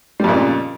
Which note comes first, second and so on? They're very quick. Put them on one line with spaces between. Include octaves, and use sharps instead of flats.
G3 F2 A#2 C#3